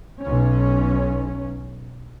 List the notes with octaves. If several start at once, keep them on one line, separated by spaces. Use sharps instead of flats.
B1 C#4